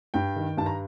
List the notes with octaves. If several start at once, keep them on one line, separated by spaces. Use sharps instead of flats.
G2 G5
D#3
G2 A5
A#5